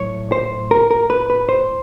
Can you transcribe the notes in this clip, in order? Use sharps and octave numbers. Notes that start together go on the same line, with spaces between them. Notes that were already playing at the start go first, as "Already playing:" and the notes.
Already playing: A2 F#3 C#5
C5
A#4
A#4
B4
B4
C5